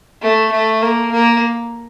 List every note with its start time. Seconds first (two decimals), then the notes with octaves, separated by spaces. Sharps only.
0.22 A3
0.52 A3
0.82 A#3
1.12 A#3